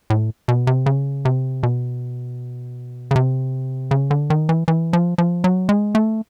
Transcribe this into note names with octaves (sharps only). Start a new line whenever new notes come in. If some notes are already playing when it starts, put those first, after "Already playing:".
A2
B2
C3
C#3
C3
B2
C#3
C3
C#3
D3
D#3
E3
E3
F3
F3
F#3
G#3
A3